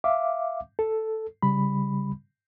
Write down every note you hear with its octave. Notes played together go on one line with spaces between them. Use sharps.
E5 F5 D6
A4
C#3 G3 B5